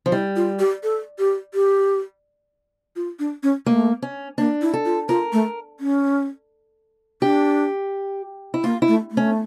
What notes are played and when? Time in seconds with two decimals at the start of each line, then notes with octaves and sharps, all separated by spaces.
0.06 F3
0.12 G3 E4
0.36 F4
0.59 G4
0.83 A4
1.19 G4
1.54 G4
2.96 F4
3.19 D4
3.43 C#4
3.66 A3 A#3
4.02 C#4
4.38 A#3 D4
4.62 E4
4.74 A4
4.85 F4
5.09 F4 A#4
5.33 A3
5.80 C#4
7.22 D4 G4
8.54 E4
8.64 A#3 F4
8.82 E4
8.88 A3
9.11 A3
9.17 C#4